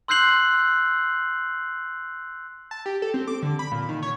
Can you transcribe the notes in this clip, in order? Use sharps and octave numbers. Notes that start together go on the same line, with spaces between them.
C6 E6 F#6 G6 C7 F#7
A5
G4
A4
C4
D6
D3
B5
A#2
D#3
C#5